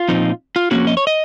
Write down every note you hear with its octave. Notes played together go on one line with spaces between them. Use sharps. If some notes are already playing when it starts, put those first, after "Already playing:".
Already playing: F4
A#2 F3 C4 D#4
F4
F2 D#3 A#3 C#4 F#4
D#5
C#5
D#5